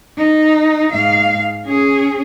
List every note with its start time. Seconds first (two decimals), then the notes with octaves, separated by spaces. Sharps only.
0.17 D#4
0.93 G#2 F5
1.66 C#4 G#4